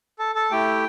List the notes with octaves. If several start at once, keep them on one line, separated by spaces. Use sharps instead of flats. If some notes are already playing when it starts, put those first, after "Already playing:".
A4 A5
A4 A5
A3 E4 G4 G5